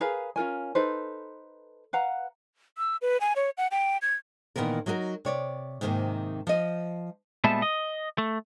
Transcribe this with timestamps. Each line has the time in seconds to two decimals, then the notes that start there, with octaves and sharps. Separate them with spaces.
0.01 G#4 A#4 B4 F5
0.36 C#4 F4 A#4 G#5
0.75 D#4 A4 B4 C5
1.93 B4 F5 F#5 A#5
2.78 E6
3.02 B4
3.21 G#5
3.36 C#5
3.58 F#5
3.71 G5
4.02 G#6
4.56 A#2 D#3 E3 B3 A#4
4.86 F#3 D#4 F#4 G#4 A#4
5.25 C3 C#5 D5
5.81 G#2 C3 D#3 A3 A#3
6.47 F3 D#5
7.44 A#2 G3 G#3 B3 E5 A5
7.62 D#5
8.18 A3